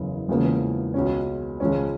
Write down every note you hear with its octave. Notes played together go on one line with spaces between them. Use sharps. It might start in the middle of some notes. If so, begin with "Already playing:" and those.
Already playing: F#1 E2 C#3
E1 E2 C#3 F3 A#3
C#2 B2 G#3 C#4
C#2 C#3 F3 G#3 C#4